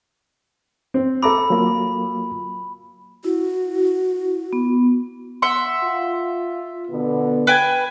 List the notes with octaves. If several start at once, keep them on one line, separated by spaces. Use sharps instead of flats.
C4
A4 A#5 B5 D6
F#3 A#3 F4
E4 F#4
B3
E5 F#5 C6
F4
B2 D3 B3
B4 G5 G#5